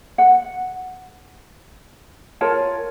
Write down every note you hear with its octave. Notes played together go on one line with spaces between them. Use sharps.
F#5
F4 A#4 C#5 A5